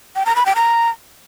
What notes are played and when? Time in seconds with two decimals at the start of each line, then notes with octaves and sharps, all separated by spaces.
0.16 G5
0.26 A#5
0.36 B5
0.46 G5
0.56 A#5